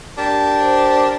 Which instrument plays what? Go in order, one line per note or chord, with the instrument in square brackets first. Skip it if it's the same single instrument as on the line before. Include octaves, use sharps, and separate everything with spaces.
[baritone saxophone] D4 [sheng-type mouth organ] G4 A#4 A5
[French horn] C5